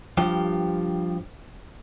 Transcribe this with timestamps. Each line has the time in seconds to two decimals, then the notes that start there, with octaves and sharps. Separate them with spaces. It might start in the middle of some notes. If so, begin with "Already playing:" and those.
0.17 G2 F3 G4